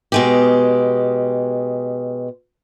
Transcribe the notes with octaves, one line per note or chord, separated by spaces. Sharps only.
B2 G#3 G4